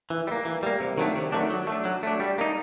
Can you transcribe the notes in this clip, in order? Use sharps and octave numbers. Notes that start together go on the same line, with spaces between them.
E3
G3
A#3
E3
G3 A#3
C3
D#3 F#3 A3 D4
C3
D#3 F#3 A3 D4
F#3
A3
D4
F#3
A3 D4
G3
A#3 D#4